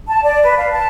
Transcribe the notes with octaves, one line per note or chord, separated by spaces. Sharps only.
A5
D5
B4
F5
A5